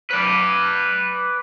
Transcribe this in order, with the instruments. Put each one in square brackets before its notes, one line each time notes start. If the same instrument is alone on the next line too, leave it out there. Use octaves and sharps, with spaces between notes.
[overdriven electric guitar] B4 D5